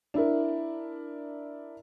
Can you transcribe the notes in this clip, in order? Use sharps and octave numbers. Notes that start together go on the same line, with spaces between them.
D4 E4 A#4